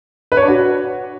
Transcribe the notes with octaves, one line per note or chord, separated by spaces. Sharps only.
B4
C#5
D4
F#4